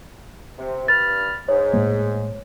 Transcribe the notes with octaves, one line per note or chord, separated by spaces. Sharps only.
C3
G2 B5 F6 A6
G#2 C#5
A2 G#3 A#3